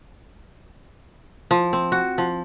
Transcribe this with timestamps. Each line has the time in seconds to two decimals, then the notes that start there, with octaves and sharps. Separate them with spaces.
1.51 F3
1.73 C4
1.92 F#4
2.18 F3